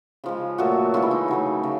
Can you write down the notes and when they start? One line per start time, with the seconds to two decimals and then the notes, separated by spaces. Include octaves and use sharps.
0.24 C#3 F3 G#3
0.58 A#2 F#3 A3 F#4
0.94 C#3 E3 G#3 F4
1.02 E4
1.11 D#4
1.28 C#3 F#3 A3
1.63 C#3